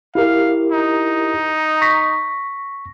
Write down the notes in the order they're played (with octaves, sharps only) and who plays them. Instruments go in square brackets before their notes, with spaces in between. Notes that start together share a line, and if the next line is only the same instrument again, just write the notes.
[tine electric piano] E4 G4 A#4 [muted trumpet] F5
[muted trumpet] D#4
[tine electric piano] C#6 A#6 B6